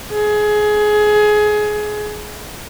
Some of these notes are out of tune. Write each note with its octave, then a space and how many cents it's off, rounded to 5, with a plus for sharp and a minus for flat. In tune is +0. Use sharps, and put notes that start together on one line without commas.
G#4 +20